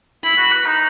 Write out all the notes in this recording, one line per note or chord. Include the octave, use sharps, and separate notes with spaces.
E4 B5
F#4
B4
D#4